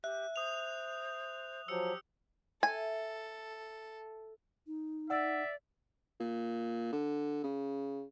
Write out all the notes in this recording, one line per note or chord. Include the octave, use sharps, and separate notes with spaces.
G4 E5 F#6
C5 D#6 F7
F3 F#3 G4 E6 C#7
A4 E5 G#5
D#4
D5 E5 F#5 E6
A#2
D3
C#3